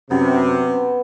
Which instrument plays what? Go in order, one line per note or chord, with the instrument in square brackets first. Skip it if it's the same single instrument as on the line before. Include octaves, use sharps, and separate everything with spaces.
[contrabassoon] F#2 [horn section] C3 [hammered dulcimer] B3